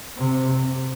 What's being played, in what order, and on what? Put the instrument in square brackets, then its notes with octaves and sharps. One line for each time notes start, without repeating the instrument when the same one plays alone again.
[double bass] C3